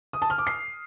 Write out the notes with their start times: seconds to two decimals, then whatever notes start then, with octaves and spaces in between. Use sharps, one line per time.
0.13 D#6
0.22 A5
0.30 F6
0.38 D6
0.47 C7